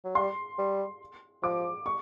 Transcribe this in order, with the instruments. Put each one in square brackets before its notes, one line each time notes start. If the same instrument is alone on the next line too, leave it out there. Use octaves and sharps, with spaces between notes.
[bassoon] F#3
[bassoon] G3 [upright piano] C6
[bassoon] G3
[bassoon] F3 [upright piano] D6
[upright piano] C#6